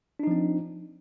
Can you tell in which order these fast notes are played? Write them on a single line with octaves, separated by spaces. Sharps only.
D4 D#4 F3 C4